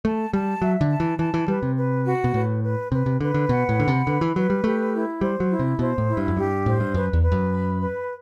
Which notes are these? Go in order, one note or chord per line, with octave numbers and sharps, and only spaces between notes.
A3 A5
G3 A5
F#3 E5
D3
A5
E3
E3 A5
E3
G3 B4
C3
B4
F#4
B2
A2 B4
B4
C3 B4
C3
D3 B4
D3
B2 F#5
A2
D3 B5
C3
D3 B4
E3
F#3 B4
G3
A3 G4
E4
G3 C5
F#3
E4
C3
B2 C5
A2
E4
G2
F#2
G2 G4
A2 C5
G2
F#2 B4
E2
B4
F#2
B5
B4